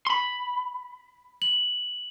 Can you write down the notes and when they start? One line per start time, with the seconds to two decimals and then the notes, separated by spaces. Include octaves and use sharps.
0.07 B5 C6
1.42 F#7